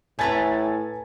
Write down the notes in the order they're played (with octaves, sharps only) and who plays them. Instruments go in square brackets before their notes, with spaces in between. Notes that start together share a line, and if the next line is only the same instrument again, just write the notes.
[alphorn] A2 [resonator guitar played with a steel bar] A3 B4 A#5 [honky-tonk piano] G#5 G#6 A6